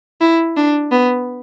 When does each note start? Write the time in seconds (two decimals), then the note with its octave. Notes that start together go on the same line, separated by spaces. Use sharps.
0.21 E4
0.57 D4
0.92 B3